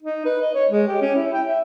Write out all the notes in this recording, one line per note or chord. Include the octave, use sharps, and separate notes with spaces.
D#4
B4
D#5
C#5
G#3
G4
C#4
E4
G5
E5